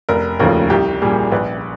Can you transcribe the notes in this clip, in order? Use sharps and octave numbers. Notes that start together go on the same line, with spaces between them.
F1 A#4
D#2 C#3 F3 A3 A#4
C2 G4
A#2 G3 G#4
A#1 B4